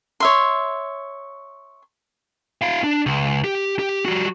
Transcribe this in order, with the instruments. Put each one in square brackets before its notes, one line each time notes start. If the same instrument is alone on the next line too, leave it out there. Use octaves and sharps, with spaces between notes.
[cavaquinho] C#5 E5 C6
[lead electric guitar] E4 F5
D4
C#2
G4
G4
G3 F#4